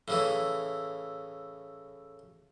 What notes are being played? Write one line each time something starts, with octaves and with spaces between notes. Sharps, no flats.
A2 C#3 E3